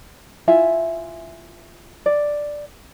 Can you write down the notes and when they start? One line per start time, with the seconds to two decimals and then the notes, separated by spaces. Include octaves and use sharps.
0.48 E4 F4 E5 G#5
2.06 D5